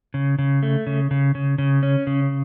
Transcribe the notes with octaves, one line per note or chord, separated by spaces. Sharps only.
C#3
C#3
A3
C#3
C#3
C#3
C#3
C#4
C#3